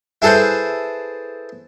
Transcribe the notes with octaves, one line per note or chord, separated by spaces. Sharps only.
E4 G#4 A4 B4 C5